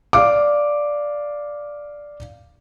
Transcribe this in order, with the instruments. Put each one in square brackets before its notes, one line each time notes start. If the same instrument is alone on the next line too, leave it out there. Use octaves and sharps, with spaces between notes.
[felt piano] D5 F5 D6